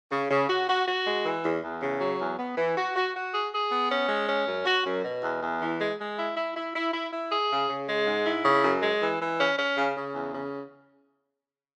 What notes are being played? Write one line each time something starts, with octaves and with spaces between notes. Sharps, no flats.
C#3
C#3
F#4
F#4
F#4
G#3
E3
E2
E2
C#3
F#3
E2
B3
E3
F#4
F#4
F#4
G#4
G#4
B3
C#4
G#3
C#4
F#2
F#4
F#2
B2
E2
E2
E3
G#3
G#3
E4
E4
E4
E4
E4
E4
G#4
C#3
C#3
G#3
G#2
E4
C#3
F#2
G#3
E3
E3
C#4
C#4
C#3
C#3
E2
C#3